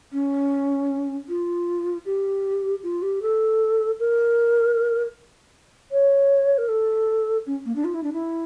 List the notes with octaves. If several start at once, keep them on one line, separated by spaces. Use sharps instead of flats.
C#4
F4
G4
F4
G4
A4
A#4
C#5
A#4
A4
C#4
A#3
D4
F4
E4
D4
E4